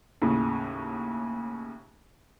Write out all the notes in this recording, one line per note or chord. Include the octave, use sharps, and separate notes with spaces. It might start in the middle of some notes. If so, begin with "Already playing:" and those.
D#2 A2 C#3